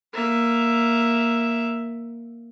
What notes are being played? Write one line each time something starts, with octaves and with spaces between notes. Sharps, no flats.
A#3 E5